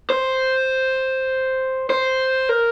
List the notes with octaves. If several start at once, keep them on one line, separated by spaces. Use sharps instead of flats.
C5
C5
A#4